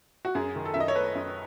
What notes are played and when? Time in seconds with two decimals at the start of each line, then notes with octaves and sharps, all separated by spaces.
0.25 F#4
0.35 F#2 G#4
0.56 D#3
0.65 A4
0.74 F#2 E5
0.80 D#5
0.88 C#5
0.96 A3 B4
1.15 F#2